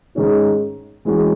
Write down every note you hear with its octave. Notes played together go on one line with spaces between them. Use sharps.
G#2 D#3 G#3 C#4 G#4
E3 G#3 C#4 F#4